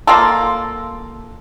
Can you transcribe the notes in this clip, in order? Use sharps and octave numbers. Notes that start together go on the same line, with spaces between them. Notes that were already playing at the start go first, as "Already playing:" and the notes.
A#3 F4 A4